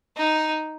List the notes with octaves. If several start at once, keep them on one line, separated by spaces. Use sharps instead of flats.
D#4